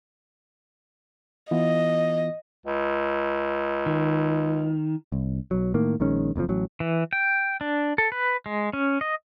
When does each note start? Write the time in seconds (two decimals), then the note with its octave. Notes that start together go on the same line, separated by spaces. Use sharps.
1.51 E3 B3 F4 D#5
2.66 C#2
3.86 D#3
5.12 C2
5.51 B1 F#3
5.74 A2 D#3 A#3
6.00 A#1 D#3 G#3 C#4
6.36 F#1 F2 A#2 F3
6.49 A1 F#3
6.80 E3
7.13 G5
7.61 D4
7.98 A4
8.12 B4
8.46 G#3
8.73 C#4
9.01 D#5